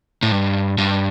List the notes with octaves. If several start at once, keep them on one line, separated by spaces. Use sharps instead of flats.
A2
G2
G2